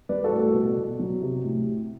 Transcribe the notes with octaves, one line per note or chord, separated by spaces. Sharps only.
G3 B4 D5
F#4 A4
A2
F#4 A4
B2
B2
F#3
C3
A2